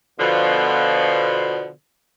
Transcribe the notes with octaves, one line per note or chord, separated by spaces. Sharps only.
B2 D3 F3